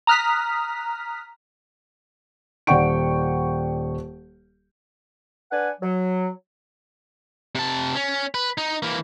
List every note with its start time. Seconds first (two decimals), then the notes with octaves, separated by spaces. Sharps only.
0.07 A#5 D#6 F6 F#6 B6
2.67 D#1 D5 F#5 G5 C#6 D7
5.51 D4 B4 F#5 G#5
5.81 F#3
7.55 C3 A5
7.95 C#4
8.34 B4
8.58 D#4
8.83 E3 A#3